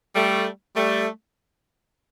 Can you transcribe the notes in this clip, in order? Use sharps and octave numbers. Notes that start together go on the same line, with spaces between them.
G3 A3
G3 A3